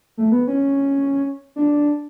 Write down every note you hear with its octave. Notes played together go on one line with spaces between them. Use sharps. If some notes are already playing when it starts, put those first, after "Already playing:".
A3
B3
C#4
D4